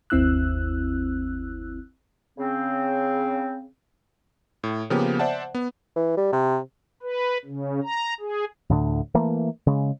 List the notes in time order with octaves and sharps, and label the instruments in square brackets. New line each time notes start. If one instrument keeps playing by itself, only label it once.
[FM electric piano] G1 D#2 C4 E4 E6 F#6
[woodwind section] C#3 C4
[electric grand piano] A2
C#3 F3 A#3 B3 G4
C5 D5 E5 F#5 A5
B3
[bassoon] E3
G3
C3
[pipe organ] B4
C#3
A#5
G#4
[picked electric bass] D2 A2 D3
E3 A3 A#3
C#3 G#3